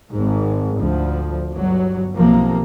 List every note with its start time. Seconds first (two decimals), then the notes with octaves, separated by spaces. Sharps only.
0.12 G#1 G#2
0.78 D2 F3
1.53 G1 F#3
2.16 B1 C3 F3 A#3